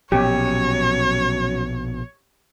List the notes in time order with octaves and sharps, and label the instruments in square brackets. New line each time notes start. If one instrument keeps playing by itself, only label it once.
[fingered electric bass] A#1 B2 [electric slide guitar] F#3 C#4 [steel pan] G4 [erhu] C#5